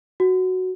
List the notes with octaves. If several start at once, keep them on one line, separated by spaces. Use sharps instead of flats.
F#4